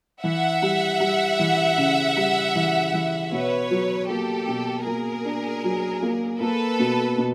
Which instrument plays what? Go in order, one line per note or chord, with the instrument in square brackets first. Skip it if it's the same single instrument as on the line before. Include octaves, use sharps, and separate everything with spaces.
[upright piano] E3 [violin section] E5 F#5
[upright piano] G3
G3
E3
C#3
G3
E3
E3
[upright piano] B2 [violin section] B4 C#5
[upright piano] F#3
[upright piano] A#3 [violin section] G4 A4
[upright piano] B2
[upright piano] A#3 [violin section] G#4 A#4
[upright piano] D4
F#3
A#3
[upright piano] A#3 [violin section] A4 B4
[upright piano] B2
B2